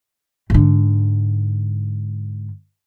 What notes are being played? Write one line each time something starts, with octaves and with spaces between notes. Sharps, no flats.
G#2 D3